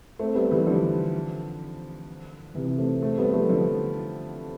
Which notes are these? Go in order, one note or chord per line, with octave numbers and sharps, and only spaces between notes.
A3 C4
G3 B3
E3 G3
D3 F3
C3 E3
A3 C4
A3 C4
G3 B3
F3 A3
D3 F3